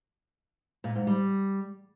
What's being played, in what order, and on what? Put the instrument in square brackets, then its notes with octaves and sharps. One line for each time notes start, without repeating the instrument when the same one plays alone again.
[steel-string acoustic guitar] A#2
G#2
G3